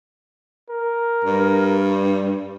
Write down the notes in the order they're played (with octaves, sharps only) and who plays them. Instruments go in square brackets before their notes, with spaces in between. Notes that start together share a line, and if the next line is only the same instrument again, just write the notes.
[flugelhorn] A#4
[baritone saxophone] G2